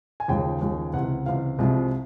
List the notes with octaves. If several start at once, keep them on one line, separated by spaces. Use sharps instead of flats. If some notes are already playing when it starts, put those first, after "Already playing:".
G#5
D#2 C#3 F3 G#3 G5
D#2 C#3 F3 G#3
C#2 C3 E3 F#5
C#2 C3 E3 F5
C2 C3 F3 G#3